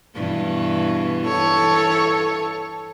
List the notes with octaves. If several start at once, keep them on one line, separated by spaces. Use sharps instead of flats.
G2 B2 E3
E3 A4 C#5